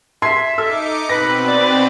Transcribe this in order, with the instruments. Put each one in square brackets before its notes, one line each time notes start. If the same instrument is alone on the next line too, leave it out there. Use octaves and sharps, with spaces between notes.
[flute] E5 [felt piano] C6 G#6 C7
[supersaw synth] D#4 D6 C#7 [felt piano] A4 E6
[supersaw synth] B2 C4 [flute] B4 [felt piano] A#6
[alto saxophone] D5